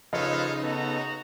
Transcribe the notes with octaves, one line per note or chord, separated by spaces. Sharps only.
C#3 F3 D#4 A4 B4 C#5 D#5 F5
B3 F#4 A4 A#5